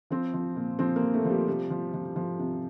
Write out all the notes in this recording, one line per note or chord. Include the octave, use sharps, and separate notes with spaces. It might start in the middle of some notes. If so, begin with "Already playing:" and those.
F3 C4
F3
A#2
F3 C4
A#3
F3
A3
F3
G3
C3 G3
F3
F3
F3
C3